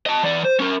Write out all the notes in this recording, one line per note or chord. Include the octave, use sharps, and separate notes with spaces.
D#5 A5
E3 D5
C5
C#4 A#4